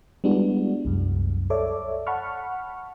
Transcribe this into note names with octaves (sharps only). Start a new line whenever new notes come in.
G3 G#3 B3 D4 E4 F#4
C2 F#2
A4 C#5 D5 E5 D6
F#5 A5 B5 C#6 F6